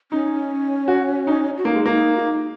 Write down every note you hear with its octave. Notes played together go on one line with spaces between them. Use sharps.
C#4 D#4
F#4
D#4
F#4
A#3 D#4
G#3
A#3
D#4
F#4
D#4